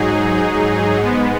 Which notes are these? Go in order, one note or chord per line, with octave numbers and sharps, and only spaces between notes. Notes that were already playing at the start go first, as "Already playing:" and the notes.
Already playing: G#2 F#3 D#4 G#4
G#2 G#3 B3